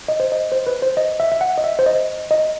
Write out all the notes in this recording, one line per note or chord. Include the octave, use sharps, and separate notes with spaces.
D#5
C5
D#5
C5
B4
C5
D#5
E5
E5
F#5
D#5
E5
C5
D#5
D#5